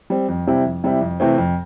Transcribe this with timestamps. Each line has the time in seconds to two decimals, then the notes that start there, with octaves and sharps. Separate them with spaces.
0.10 G3 C4
0.28 F2
0.47 C3 G3 C4 E4
0.65 F2
0.84 C3 G3 C4 E4
1.01 F2
1.20 C3 E3 A3 C4
1.38 F2